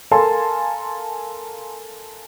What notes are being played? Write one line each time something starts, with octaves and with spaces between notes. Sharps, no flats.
A4 A#4 F5 G#5 A5 C6